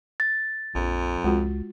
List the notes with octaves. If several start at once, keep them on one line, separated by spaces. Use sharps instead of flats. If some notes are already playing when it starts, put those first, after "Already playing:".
A6
A#1 F2
C#2 G#3 F4 F#4